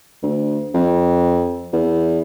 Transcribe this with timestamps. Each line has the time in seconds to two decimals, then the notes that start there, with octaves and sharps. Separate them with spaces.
0.22 D2
0.74 F2
1.73 E2